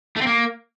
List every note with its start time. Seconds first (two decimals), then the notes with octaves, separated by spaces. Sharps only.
0.16 A3
0.21 C4
0.27 A#3